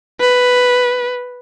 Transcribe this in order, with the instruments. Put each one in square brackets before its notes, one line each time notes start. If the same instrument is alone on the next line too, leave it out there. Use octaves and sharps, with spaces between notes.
[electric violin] B4